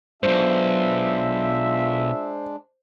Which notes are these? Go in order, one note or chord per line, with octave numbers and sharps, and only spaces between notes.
B1 G2 G#3 D4 F4 C5 E5